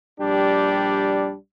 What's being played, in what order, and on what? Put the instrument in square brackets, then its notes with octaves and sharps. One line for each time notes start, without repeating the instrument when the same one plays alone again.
[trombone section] A#1 G3 D4 G4